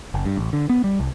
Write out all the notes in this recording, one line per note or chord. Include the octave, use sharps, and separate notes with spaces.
F#1
G2
A1
D3
B3
G3
C2